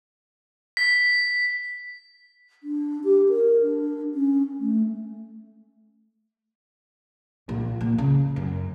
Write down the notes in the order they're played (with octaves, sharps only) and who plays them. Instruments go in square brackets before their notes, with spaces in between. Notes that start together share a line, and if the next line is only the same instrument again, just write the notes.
[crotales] B6
[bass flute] D4
G4
A#4
D4
C#4
A3
[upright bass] A#1
A#2
C#3
F#2